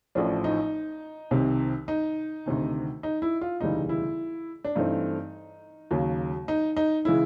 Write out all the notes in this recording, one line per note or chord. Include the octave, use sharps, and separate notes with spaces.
A1 A2 F3 D4
D#4
C2 C3 D#3
D#4
D2 C3 D#3
D#4
E4
F4
E1 D2 C#3 E3 G3 D#4
E4
D4
G2 E3 A3 C4 D#4
D#2 C#3 F#3
D#4
D#4
C#3 E3 G#3 E4